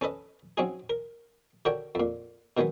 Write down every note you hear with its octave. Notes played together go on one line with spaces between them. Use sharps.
C#4 A4 B4 D#5
F#3 C4 C#4 D#4 G#4
A#4
D3 F#4 A#4 C#5 G5
F2 A#2
B2 D#3 F#3 G#3 B3